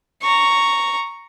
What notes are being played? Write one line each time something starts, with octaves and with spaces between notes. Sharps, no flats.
A#5 C#6